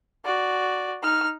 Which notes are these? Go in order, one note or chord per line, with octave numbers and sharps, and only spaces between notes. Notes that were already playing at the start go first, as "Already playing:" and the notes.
F#4 D5
D#4 F6